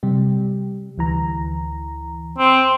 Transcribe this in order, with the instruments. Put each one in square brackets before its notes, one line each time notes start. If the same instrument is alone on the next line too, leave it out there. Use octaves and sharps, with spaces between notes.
[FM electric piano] C3 G3 G4
D2 E3 A#5
[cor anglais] C4